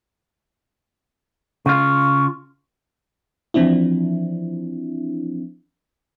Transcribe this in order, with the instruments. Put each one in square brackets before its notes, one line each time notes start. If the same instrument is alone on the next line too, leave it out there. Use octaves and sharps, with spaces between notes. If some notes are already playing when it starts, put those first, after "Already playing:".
[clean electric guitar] C#3 F4 [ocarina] C#6
[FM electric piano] E3 F3 C4 D4 E4